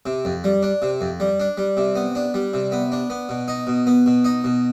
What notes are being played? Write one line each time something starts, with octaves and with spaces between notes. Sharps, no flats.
C3
F2
G3
D4
C3
F2
G3
D4
G3
C3
B3
D4
G3
C3
B3
D4
B3
B2
D#4
B2
B3
B2
D#4
B2